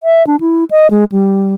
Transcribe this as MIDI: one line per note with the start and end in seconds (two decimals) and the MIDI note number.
0.03 0.25 76
0.27 0.36 62
0.40 0.64 64
0.71 0.87 75
0.90 1.04 56
1.12 1.54 55